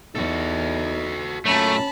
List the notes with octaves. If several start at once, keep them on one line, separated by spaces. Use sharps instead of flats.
E2 D#4 F#4 A4
F#2 A#2 A3 C#4 A5 B5